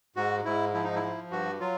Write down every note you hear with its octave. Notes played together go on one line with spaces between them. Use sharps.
G#2 F#4
G#2 E4
F3 E4
D#4
E4
F3
G2 F#4
F#3 F4